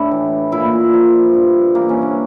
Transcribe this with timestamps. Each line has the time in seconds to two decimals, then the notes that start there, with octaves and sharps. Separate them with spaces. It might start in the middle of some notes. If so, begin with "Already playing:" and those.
Already playing: A2 D4 E4
0.11 E3
0.52 A#2 E4
0.93 F3
1.34 G2
1.75 E3 A#3
1.89 C#4
2.02 D4